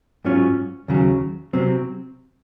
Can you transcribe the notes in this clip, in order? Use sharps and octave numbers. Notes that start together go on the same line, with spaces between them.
G#2 F#3 C#4 F4
D#2 C#3 F#3
C3 F#3 C4